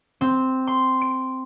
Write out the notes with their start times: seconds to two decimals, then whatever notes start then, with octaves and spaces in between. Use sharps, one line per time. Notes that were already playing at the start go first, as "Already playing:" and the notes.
0.21 C4
0.67 C6
1.01 D7